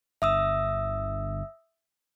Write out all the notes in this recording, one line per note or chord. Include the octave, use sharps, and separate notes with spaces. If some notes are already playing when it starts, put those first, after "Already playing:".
G1 E5 D#6 E6